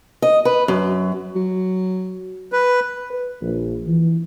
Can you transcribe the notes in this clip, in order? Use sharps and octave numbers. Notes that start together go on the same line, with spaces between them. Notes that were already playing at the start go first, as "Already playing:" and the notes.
D#5
B4
F#2
F#3
B4
B4
A#1
E3